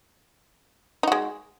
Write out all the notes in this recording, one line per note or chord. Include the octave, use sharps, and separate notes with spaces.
G#3 D#4 F#4